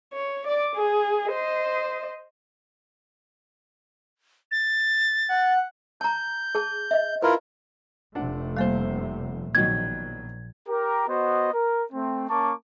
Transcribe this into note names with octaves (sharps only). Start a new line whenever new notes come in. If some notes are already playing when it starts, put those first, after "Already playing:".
C#5
D5 D6
G#4
C5 D#5
A6
F#5
A5 A#5 G6
G#4 A5
D#5 E5
E4 F4 A#4 B4
F1 C3 A3 D4 F#5
G3 A#3 C5 F5
A#1 B2 D#3 F#3 G#6
G4 A#4
B3 F#4 C5 D#5
A#4
A3 C4
A#3 C#4 A5 C#6 D6